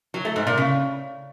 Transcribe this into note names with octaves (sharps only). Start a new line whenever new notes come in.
F#3
A3
G#2
A#2
C#3